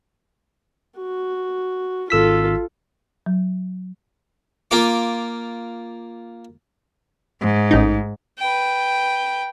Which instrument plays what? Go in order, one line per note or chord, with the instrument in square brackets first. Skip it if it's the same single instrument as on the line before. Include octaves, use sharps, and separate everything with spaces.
[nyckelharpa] F#4
[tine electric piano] G#1 E6 B6 [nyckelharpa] F4 A4
[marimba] F#3
[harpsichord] A#3 F4 D6
[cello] G#2
[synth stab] A1 D#4
[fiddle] B4 G5